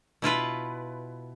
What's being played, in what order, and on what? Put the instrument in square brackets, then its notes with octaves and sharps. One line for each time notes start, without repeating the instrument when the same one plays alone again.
[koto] B2 E4 F4 B4